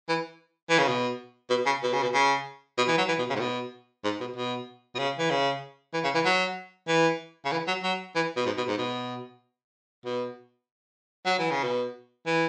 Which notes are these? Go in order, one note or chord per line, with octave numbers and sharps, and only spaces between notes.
E3
E3
C#3
B2
B2
C#3
B2
C#3
B2
C#3
B2
E3
F#3
E3
B2
C#3
G#2
B2
G#2
B2
B2
B2
C#3
E3
C#3
E3
C#3
E3
F#3
E3
C#3
E3
F#3
F#3
E3
B2
G#2
B2
G#2
B2
B2
F#3
E3
C#3
B2
E3